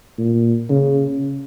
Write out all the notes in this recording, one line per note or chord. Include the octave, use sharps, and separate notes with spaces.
A#2
C#3